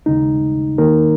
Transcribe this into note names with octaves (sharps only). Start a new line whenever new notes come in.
D#2 C#3 G#3 D#4
E2 D#3 A#3 D#4 A#4